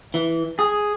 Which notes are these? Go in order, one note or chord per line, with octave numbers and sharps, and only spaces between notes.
E3
G#4